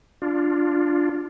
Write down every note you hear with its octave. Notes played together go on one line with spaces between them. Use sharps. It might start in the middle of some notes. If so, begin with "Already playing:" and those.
D4 F4